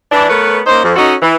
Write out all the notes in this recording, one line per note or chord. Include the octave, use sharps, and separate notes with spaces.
E3 D4
A3 B3 A#4 B4 C#5
A#3 C#4 D#4 C5
F2
C#4 D#4 F#4 A4 D#5
E3